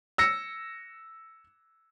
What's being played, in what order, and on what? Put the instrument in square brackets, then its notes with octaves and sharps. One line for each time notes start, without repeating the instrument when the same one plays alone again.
[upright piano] E6 A#6 C#7